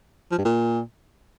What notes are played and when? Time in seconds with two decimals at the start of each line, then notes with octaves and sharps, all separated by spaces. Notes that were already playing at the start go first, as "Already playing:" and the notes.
0.32 F3
0.38 G2
0.45 A#2